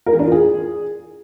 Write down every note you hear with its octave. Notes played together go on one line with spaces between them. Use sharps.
A#4
E3
D4
F4
G#4